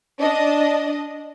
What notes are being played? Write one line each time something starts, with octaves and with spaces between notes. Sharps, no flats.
D4 D#5